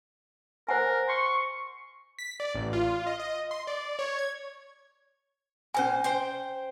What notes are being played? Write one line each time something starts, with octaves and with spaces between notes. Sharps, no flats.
A#4 C5 F#5 G#5
C6 C#6
B6
D5
A1
F4
D#5
D#5
C6
D5
C#5
G#6
A#2 C#4 C5 G#5
C5 G5